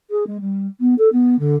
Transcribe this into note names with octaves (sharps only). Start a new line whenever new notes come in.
G#4
G#3
G3
B3
A4
B3
D3